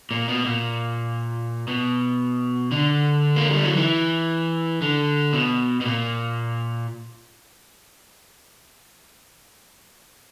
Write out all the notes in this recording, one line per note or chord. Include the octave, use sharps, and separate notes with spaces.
A#2
B2
A#2
B2
D3
A#3
G3
F#3
E3
D3
B2
B2
A#2